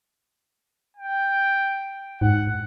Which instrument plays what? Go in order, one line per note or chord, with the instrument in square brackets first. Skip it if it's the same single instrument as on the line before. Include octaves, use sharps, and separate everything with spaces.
[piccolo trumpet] G5
[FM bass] G#2 [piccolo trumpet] F#5